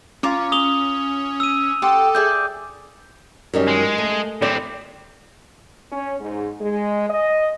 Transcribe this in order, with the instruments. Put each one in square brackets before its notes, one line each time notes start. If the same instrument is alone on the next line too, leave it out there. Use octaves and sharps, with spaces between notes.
[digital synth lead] C#4 [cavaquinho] F4 A#5 D6
[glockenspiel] D#6 F7 G7
E6 D#7
[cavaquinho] G4 F#5 C6 [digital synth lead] A4
[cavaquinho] G#4 D5 E5 [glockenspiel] G6
[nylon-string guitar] F#2 D#3 G3
[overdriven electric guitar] G#3
[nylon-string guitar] A3
[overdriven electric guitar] A2 C4 [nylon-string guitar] D5
[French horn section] C#4
G#2
G#3
D#5